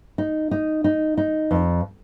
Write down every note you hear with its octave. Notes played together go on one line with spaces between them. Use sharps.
D#4
D#4
D#4
D#4
F2